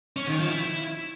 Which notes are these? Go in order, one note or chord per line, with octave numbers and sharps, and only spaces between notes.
C#4
D#3
F3
E4